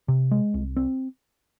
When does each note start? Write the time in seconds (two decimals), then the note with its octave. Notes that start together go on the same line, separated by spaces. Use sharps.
0.08 C3
0.31 G#3
0.54 C2
0.77 C4